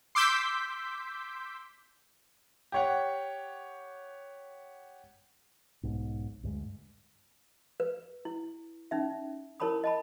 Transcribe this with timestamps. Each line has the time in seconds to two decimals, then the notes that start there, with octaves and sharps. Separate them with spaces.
0.15 C6 D6 E6 G6 B6
2.72 G4 C#5 F#5
5.83 B1 G#2
6.43 D2 G2 G#3
7.80 B4
8.25 E4
8.91 C#4 D#4 E5
9.60 E4 A#4 C#5 A5 B5 D#6
9.84 D#5 A5 B5